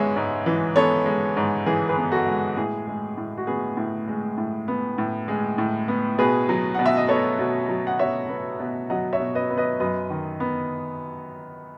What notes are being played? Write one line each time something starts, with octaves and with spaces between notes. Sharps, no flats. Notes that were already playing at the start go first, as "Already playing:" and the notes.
Already playing: G#2 G#3 B3 C#5 E5
G#2
E3
B3 A4 C#5
G#3
G#2
E3 G#4
G#4 B4
B3
F#4 A4
G#3
A2 G#4
G#3
A2
F#4
B3 G#4
A2
G#3
A2
B3
A2
G#3
A2
B3
B2 G#4 B4
F#3
B2 F#5
E5
D#5
B3 A4 C#5
B2
F#3
F#5
B2 C#5 E5
B3
B2
F#3 D#5 F#5
C#5 E5
B2
B4 D#5
B3
B4 D#5
F#2 B4 D#5
D#3
B3